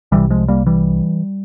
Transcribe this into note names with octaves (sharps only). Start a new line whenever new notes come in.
C2 C3 E3 G3
F3 G#3
G3 A#3
E3 G3